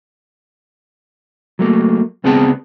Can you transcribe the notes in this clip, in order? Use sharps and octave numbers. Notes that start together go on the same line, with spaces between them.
F#3 A3 A#3
C#2 B3 C4 G#4 A5